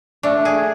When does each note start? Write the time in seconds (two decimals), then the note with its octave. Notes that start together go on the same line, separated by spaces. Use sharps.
0.23 A3 D4
0.45 G#4